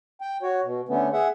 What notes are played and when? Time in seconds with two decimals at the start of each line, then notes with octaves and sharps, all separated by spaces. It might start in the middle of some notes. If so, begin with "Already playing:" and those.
0.21 G5
0.43 F#4 C#5
0.63 B2
0.89 D3 A3 B3 C#4
1.13 G#4 E5 F#5